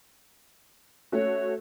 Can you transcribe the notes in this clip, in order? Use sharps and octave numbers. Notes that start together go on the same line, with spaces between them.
A3 C#4 F#4 C#5